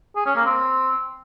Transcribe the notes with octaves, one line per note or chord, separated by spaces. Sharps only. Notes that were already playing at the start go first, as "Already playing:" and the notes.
G#4
C#4
A#3
C4